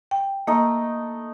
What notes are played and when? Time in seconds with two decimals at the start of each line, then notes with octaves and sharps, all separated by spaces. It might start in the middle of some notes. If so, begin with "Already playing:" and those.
0.11 G5
0.47 A3 A#3 D#4